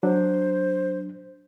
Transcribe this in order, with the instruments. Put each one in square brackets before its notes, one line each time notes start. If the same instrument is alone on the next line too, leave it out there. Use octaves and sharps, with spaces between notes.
[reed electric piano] F#3 D4 [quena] C5